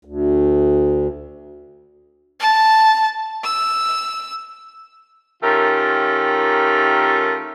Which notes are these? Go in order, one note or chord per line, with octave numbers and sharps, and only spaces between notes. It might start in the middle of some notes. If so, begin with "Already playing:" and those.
D2
A5
E6
D#3 A3 C#4 F4 G4 A#4